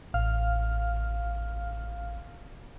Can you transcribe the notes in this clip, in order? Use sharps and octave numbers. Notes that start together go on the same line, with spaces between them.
A1 F5 F6